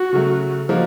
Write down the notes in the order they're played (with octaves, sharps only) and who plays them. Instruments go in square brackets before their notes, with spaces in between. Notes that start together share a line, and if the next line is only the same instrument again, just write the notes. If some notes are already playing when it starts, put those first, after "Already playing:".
Already playing: [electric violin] F#4
[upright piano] C#3 F#3 A3
F3 A#3 D#4 F#4